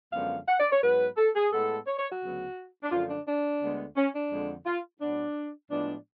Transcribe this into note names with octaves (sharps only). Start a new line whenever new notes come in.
F#2 D3 F3 G#3 B3 F5
F#5
D5
C#5
G#2 F#3 B3 B4
A4
G#4
A2 G#3 B3 A4
C#5
C#5
F#4
D2 C#3 F#3 B3
D4
F#2 D3 F3 A3 F4
D4
D4
D2 D3 G#3 B3
C#4
D4
F2 D3 G#3
F4
A2 F#3 B3 D4
A2 F3 G#3 B3 D4